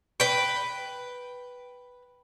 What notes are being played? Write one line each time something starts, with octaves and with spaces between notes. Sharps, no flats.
B4 G5